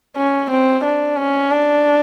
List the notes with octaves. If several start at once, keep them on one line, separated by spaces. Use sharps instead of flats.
C#4
C4
D4
C#4
D4